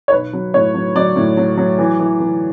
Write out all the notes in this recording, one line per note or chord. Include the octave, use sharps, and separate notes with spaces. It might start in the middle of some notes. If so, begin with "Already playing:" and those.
C#5
B1 B4
F#3
A2 C#5
F#3
F#3 D5
A2
F#3
F#3
E3
E3
E3